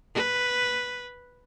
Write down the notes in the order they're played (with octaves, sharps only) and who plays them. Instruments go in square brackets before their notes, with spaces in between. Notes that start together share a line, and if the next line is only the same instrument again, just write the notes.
[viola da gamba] B4